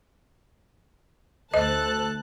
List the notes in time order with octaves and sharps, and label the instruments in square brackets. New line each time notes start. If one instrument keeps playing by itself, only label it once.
[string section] D2 A5 F#6 [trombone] A4 [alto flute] C5 [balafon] D#5